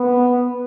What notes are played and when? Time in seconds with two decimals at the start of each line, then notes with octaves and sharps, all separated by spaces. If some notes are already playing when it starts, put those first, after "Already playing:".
Already playing: B3